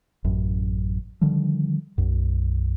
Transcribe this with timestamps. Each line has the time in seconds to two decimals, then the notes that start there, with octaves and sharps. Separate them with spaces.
0.24 A1 F#2
1.21 D3 D#3 F3 G3
1.98 B1 F#2